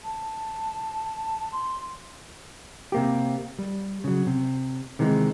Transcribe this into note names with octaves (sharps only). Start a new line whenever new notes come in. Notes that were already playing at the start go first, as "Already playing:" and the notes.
A5
C6
C3 A#3 G4
G3
C#3 F#3
C3
C3 D#3 E3 G#3